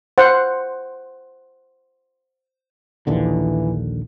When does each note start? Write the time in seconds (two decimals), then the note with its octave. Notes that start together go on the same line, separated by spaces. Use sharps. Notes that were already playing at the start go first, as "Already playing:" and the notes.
0.18 C5 F#5
3.07 A#1 D#2 D3 E3